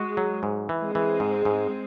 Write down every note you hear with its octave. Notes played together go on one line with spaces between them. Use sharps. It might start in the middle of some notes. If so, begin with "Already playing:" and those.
Already playing: G#3 F#4
F#3
G#2
E3
G#3 C4
E3
G#2
G#2